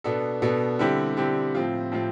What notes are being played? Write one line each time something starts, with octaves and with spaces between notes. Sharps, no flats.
B2 B3 D4 A4
B2 B3 D4 A4
D3 G3 C4 E4 G4
D3 G3 C4 E4 G4
A2 F3 C4 F4
A2 F3 C4 F4